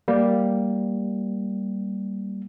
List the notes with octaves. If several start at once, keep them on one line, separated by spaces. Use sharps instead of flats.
G3 A#3